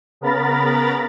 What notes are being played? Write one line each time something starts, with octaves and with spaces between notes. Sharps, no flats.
C#3 B3 A#4 A#5 B5 A6